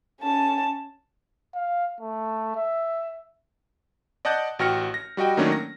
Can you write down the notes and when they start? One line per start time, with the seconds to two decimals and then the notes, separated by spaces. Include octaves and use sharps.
0.22 C#4 A5
1.54 F5
2.01 A3
2.56 E5
4.25 D5 D#5 F#5 A5 F#6 G6
4.59 A1 F#4 G5 F6 A#6 C#7
4.94 A#6
5.17 G3 F#4 D#5 G5
5.37 D#3 F#3 A3 A#3 C#4 D4
5.52 A#6